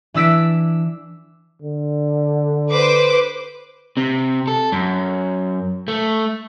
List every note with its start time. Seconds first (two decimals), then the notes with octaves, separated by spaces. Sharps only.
0.14 E3 D4 E6 B6 D7
1.62 D3
2.70 B4 C5 D6
3.97 C3
4.48 A4
4.72 F#2
5.88 A3